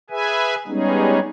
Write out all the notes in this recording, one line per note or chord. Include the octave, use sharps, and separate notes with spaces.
G#4 B4 E5 G#5
G3 G#3 B3 C#4 D#4 G#4